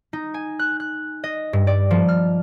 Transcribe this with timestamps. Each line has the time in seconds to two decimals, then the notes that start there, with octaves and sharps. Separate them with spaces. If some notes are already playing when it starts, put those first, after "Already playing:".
0.13 D#4
0.34 G#5
0.59 F#6
0.80 F#6
1.24 D#5
1.53 G2
1.67 D5
1.91 F3
2.08 F6